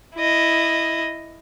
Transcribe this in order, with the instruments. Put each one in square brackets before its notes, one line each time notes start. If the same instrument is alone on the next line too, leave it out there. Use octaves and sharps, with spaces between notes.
[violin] E4 D#5